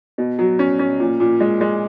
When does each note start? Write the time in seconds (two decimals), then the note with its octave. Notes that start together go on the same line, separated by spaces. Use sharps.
0.18 B2
0.39 F#3
0.59 C#4
0.79 C#4
1.00 A#2
1.20 A#2
1.40 G#3
1.61 G#3